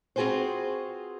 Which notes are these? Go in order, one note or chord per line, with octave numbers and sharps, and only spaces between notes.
C4 F4 F#4 G#4 B4 C5